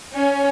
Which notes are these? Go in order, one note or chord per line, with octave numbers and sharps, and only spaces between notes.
C#4